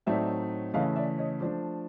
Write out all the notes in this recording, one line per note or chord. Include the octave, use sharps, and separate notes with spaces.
A2 F#3 A3 C4 D#4 D5 E5
C#3 E3 A3 D#5 F5
D5 E5
C#5 D#5
F3 A3 D4 C5 D5